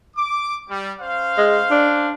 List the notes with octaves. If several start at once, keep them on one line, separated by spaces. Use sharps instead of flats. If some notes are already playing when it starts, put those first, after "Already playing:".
D6
G3
C#4 C5 F5
G#3
D4